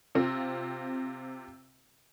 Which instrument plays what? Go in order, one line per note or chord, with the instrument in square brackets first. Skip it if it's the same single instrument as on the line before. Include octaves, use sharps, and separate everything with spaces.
[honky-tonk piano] C3 C4 F4